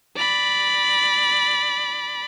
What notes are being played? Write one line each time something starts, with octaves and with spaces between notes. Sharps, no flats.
D5 B5